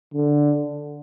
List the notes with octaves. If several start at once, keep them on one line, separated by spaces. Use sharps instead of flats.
D3